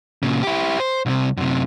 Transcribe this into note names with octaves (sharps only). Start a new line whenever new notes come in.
A#2 C#3
E4 G4
C5
C2 C3
F#2 C3